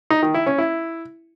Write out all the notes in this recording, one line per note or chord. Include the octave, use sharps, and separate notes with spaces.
D#4
D#3
E4
C#4
E4